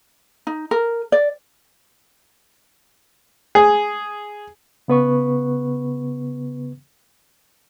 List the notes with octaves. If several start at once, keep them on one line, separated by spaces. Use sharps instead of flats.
D#4
A#4
D5
G#4
C#3 B3 B4 C#6